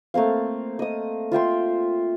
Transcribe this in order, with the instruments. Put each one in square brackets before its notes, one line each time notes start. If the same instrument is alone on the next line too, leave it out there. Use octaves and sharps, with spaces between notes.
[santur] A3 A#3 C4 F5
D#5 D#6
F4 E5 G5 C6